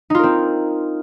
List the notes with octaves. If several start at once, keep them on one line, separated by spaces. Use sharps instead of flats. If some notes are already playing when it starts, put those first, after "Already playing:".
C4 D#4 F4 A#4